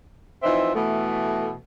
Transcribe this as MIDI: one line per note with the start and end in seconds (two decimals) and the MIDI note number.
0.43 0.75 52
0.43 0.75 53
0.43 0.75 60
0.43 0.75 63
0.43 0.75 76
0.75 1.54 47
0.75 1.54 52
0.75 1.54 57